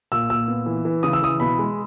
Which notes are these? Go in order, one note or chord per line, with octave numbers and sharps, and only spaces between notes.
A#2 E6
A#2 E6
B3
E3
E3
C#3 D#6
E6
E3 D#6
B2 B5
G#3